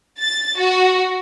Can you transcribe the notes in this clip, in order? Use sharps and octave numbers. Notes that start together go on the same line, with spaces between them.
A6
F#4